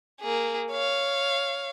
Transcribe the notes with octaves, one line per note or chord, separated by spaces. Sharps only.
A#3 G#4
C#5 F5